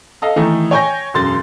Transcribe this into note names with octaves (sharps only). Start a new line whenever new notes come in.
A4 D#5 F5
D#3 E3 A3 D#4
C#5 G5 G#5 C#6 G6 A#6
E1 F#2 C6 A6